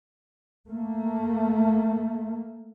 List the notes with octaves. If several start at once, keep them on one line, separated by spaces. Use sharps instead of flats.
A3 A#3